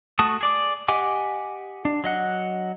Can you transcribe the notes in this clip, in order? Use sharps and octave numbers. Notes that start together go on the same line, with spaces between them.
A3 F#4 A5 D#6
G#4 D5 D6
G4 D#5 F#5 G#5 D6
D4
F#3 D#5 F#5